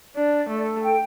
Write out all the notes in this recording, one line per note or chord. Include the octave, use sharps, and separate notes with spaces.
D4 D5
A3 A4
G5